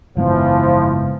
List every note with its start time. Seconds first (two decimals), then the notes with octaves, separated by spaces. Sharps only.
0.17 F#1 G#2 E3 F3 B3